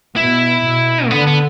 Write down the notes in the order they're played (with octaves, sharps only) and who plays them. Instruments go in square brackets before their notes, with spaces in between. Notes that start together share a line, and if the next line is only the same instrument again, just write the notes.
[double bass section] B2 [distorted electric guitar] E4
[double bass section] B2
[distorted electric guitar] A3
[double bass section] D3 [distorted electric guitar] B3
[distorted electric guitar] B3